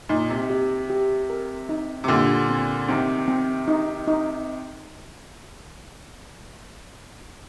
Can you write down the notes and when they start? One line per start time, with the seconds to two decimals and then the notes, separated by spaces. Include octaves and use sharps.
0.09 A#2 D#4
0.30 C3
0.50 G4
0.90 G4
1.30 A#4
1.69 D#4
2.04 C3
2.08 A#2 D3 G4
2.49 C4
2.88 C3 D#3 C4
3.28 C4
3.68 D#4
4.08 D#4